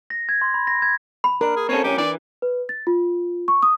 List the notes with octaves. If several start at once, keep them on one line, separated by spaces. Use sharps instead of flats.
A#6
G#6
C6
B5
A#6
G#6
B5
D4 A#4
G#4
C4 C#4 A4 C#5
B1 C#4 G4
E3 D4 D5
B4
A6
F4
C#6
D#6